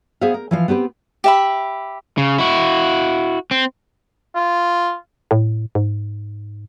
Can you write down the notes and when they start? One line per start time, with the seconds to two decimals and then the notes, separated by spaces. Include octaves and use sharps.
0.21 B3 G#4 C5 E5 F5
0.34 A#4
0.51 E3 F3 F5
0.68 B3 C4 G4 B4
1.24 G4 E5 B5
2.18 C#3
2.38 E4 F#4
3.51 C4
4.35 F4
5.31 A2
5.75 G#2